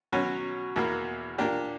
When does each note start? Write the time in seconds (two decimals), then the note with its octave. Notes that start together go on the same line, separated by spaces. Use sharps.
0.12 B2 F#3 C#4 F#4
0.76 E2 B2 A#3
1.38 A#2 A#3 D4 G4